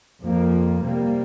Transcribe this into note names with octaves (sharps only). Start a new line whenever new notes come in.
F2 F3 A#3
C3 G3 A#3